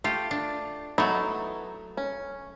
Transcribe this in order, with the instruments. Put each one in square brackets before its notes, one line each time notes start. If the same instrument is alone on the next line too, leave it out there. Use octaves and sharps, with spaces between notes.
[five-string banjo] A3 [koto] F4 G4
[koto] D4
[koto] F#3 A3 [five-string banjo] B3 D#4 E4
[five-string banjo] C#4